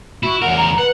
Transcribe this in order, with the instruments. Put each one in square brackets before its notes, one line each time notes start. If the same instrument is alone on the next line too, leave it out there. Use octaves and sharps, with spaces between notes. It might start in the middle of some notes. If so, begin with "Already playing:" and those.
[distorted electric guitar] E4 [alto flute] F#4
[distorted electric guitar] E2 A#4 [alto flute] F#5
[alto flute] A#5
[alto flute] B4 [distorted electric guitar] F#5